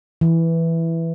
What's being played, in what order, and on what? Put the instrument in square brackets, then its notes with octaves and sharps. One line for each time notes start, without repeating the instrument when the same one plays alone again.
[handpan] E3